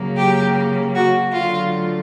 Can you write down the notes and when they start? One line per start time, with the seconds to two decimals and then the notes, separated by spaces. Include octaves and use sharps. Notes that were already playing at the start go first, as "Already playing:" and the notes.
Already playing: C#3 F#3 A#3
0.17 G4
0.95 F#4
1.33 D3 F#3 A3 F4